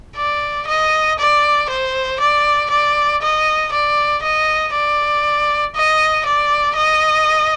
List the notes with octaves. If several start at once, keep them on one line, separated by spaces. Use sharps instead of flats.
D5
D#5
D5
C5
D5
D5
D#5
D5
D#5
D5
D#5
D5
D#5